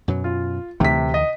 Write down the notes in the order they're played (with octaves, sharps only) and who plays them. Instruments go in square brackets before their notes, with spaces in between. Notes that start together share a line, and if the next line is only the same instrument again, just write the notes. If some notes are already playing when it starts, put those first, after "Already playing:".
[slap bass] F#2 B2 F#3
[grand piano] F4
[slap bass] D2 E3 A3 [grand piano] C3 B6
[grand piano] D#5